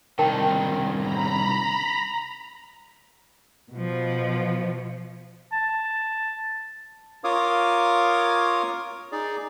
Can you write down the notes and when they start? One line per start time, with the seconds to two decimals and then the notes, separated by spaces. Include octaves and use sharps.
0.19 C2 D#3 A#4 G5 A5
0.94 A#5 B5
3.72 B2 F3
5.52 A5
7.24 F4 A#4 C#5 F5 D6 D#6
9.12 D#4 G#4 D5